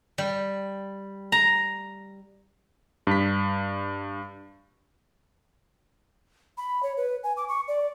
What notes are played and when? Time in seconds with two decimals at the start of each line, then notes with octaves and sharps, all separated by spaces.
0.18 G3
1.32 A#5
3.07 G2 B6
6.58 B5
6.83 C#5
6.97 B4
7.23 G#5
7.37 D6
7.49 C#6
7.68 D5